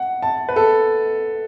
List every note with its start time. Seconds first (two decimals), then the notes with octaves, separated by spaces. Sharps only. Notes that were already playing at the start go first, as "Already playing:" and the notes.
Already playing: F#5
0.22 A5
0.49 B4
0.56 A4